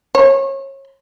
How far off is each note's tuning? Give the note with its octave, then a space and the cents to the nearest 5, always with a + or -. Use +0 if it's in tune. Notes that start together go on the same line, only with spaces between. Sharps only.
C#5 -30